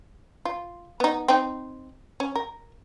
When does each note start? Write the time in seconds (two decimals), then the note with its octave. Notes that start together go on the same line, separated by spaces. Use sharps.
0.45 F4
1.00 B3 D#4
1.28 C4 D#4
2.20 C#4
2.36 A#4